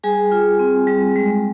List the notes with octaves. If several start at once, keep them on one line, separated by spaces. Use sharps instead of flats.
G3 G#4 G#5
F4
C4
G3
G#3